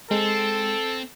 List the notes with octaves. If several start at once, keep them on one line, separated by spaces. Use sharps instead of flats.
G#3 C4 A4